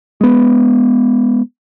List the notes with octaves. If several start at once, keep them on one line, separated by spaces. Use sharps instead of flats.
G#3 B3